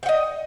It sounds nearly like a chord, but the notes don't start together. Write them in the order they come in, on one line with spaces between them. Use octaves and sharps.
G5 F#5 D#5